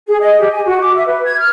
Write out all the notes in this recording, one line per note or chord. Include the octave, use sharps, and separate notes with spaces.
G#4
D#5
G4
G#5
F#4
D6
E5
B4
G#6
F6